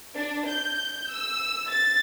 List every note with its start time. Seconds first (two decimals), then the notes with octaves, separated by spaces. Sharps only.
0.17 D4
0.49 G6
1.13 E6
1.70 A6